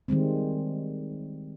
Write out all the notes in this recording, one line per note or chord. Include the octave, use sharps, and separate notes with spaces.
D#3 G3 G#3 C4